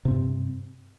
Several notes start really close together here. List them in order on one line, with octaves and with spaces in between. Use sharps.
C3 C4 G2